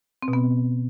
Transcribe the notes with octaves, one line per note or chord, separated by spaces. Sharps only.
C4
B2
B3